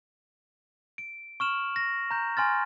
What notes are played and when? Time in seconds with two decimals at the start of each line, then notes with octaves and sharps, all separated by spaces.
0.98 D7
1.40 C#6 F6 E7 F#7
1.76 A#6
2.11 A#5 G6
2.37 G#5 C6 F6 A6